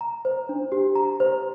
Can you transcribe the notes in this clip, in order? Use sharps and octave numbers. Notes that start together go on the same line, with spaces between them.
A#5
C5
D4
G4
A#5
C5